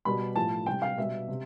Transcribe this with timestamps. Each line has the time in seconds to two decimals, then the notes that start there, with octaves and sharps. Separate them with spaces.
0.05 B2 G3 B5
0.36 A2 F3 A5
0.66 C3 G3 G5
0.82 F5
0.98 B2 G3 E5
1.28 C3